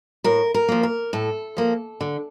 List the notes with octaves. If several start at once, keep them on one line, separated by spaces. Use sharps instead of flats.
A2 A#4
A#4
F3 A#3
A#4
A2 A4
F3 A#3
D3